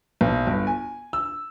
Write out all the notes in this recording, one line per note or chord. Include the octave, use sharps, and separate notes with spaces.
B1
G1
G#5
E6